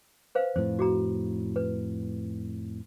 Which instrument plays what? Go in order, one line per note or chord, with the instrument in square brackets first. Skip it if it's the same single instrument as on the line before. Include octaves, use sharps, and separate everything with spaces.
[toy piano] B4 C5 F5
[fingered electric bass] F2 A2 [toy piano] C5
[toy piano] F#4 G#4 A#5
B4